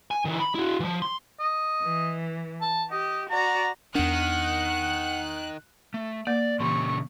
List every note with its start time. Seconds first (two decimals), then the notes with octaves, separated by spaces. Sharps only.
0.11 G#5
0.25 D#3 E3
0.40 B5
0.55 E4 F#4
0.80 E3 F3
1.02 C6
1.40 D#5
1.82 E3
2.61 A5
2.91 G4 D#5
3.30 F#4 D5 A#5
3.95 E2 D#3 D4 F#5 F#6
5.94 A3
6.27 A#3 D5
6.60 A#2 C#3 E3 G4 C#6